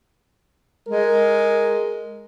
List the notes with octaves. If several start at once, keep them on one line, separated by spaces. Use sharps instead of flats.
G#3 A#4